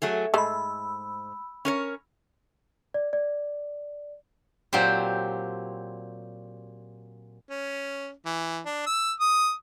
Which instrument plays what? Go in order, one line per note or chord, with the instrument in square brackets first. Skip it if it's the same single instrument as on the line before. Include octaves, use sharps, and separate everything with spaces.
[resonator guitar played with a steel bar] F#3 A3 G#4
[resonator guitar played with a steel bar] G#2 [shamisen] G#3 A3 [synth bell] B5 E6
[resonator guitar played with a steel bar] C#4 A#4 C#5
[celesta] D5
D5
[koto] A#2 F#3 C4 G4 C5
[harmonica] C#4
E3
D4
E6
D#6